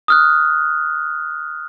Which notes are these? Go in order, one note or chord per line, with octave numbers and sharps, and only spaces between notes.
D#6 F6 F#6